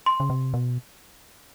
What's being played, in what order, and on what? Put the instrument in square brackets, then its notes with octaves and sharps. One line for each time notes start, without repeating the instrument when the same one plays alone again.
[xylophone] C6
[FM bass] C#3
C3
B2